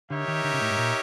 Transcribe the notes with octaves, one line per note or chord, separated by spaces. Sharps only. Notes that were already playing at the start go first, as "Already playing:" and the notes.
D3 D#4 G4 A#4 C#5 E5
D#3
D3
C#3
A2
G#2
A#2